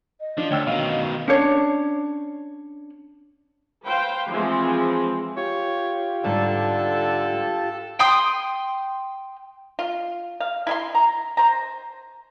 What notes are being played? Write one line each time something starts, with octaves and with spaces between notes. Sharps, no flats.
D#5
F3 D4
D2 C#5 G5 E6
B2 D#3 D#5 F5
C#4 D4 C#5
B4 C5 F5 G5
E3 F3 G#3 C4
F4 G4 C#5
G#2 D3 G3 A4 A5
G5 C6 D#6
F4
F5
E4 E5 C6
A#5
C5 A#5